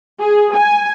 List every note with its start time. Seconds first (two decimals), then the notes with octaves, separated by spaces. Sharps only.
0.21 G#4
0.55 G#5